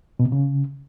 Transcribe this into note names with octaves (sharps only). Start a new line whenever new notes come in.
B2
C3
C#3